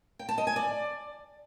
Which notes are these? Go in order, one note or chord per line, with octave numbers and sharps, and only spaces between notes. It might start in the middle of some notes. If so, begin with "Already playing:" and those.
G5
A5
D#5
G#5
D5